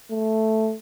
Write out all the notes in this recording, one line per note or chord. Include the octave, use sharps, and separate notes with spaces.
A3